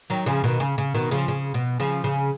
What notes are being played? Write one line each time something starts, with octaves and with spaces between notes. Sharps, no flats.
D#3 F#3
C#3 F3
B2 D#3
C#3
C#3
B2 D#3
C#3 F3
C#3
B2
C#3 F3
C#3